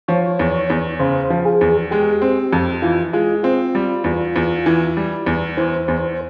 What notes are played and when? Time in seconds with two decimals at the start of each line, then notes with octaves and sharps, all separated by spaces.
0.08 F3 C#5
0.39 E2
0.70 E2
0.99 C#3 C5
1.30 F3
1.45 G#4
1.61 E2
1.91 G#3 G4
2.22 C4
2.53 F2
2.82 E3 F4
3.13 G#3 F4
3.43 C4 F4
3.75 G3
4.04 E2
4.36 E2
4.66 E3
4.97 G3
5.26 E2
5.57 E3 C5
5.88 E2